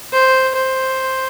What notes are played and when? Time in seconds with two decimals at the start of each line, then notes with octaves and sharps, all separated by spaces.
0.13 C5
0.55 C5